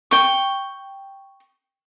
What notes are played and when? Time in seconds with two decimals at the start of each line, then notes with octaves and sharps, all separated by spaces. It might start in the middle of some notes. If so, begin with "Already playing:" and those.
0.11 G5 C#6